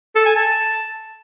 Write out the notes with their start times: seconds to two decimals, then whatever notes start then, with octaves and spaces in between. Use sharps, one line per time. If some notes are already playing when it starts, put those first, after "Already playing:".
0.15 A4
0.25 G#5
0.35 A5